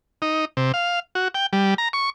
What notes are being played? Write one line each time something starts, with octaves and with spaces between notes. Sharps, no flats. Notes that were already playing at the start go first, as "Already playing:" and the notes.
D#4
C3
F5
F#4
G5
G3
A#5
C#6